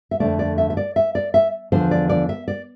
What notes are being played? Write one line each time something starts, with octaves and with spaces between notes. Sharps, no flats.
E5
F2 D3 A3 D5
D5
E5
E5
D5
E5
D5
E5
E2 D3 F3 C5
D5
D5
E5
D5